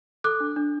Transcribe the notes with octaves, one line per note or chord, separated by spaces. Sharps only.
A4 D6 F#6
D4
D4